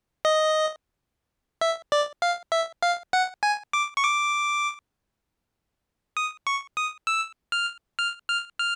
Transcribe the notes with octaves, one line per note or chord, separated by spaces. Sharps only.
D#5
E5
D5
F5
E5
F5
F#5
G#5
D6
C#6
D6
D#6
C#6
D#6
E6
F6
F6
F6
F6